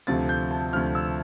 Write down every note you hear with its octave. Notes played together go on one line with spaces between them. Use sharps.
D2 C3 F3 A6
G6
A5
D2 C3 F3 F6
E6